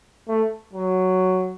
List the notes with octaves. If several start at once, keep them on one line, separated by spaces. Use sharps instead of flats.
A3
F#3